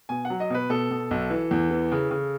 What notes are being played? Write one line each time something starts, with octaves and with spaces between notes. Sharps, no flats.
B2 G#5
F#5
F#3
D#5
B2 B4
B2 A4
B2
B1
E3
E2
E3
C#3
C#3